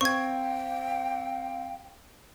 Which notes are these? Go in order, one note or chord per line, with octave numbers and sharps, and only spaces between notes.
C4 F5 G5 C#6 G#6